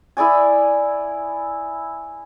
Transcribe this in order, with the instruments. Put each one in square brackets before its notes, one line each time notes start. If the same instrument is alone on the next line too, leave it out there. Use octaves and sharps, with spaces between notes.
[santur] E4 G#4 D5 G#5